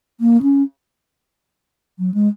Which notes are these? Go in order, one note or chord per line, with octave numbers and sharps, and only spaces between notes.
A#3
C#4
F#3
G#3